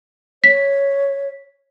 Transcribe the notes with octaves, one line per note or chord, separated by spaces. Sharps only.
C#5 B6